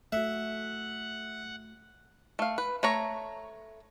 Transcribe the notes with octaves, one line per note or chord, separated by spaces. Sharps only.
A3 F#4 E5 F#5
A3 F5
B4
A3 C#5 A#5